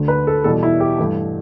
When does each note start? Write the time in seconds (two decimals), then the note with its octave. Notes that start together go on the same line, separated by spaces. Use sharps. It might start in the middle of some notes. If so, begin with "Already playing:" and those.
Already playing: D2 D3 A3
0.08 B4
0.27 A4
0.44 E2 B2 G3 A4
0.63 E4
0.80 G4
0.98 G2 E3 A3